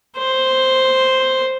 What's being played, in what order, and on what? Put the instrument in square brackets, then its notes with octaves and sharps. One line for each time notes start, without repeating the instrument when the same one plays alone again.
[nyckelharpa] C5